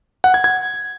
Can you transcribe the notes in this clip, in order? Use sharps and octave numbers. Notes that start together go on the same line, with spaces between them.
F#5
G#6
G#6